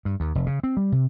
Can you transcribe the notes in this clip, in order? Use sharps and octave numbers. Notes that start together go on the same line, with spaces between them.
G2
D#2
F1
C#3
C4
G3
C3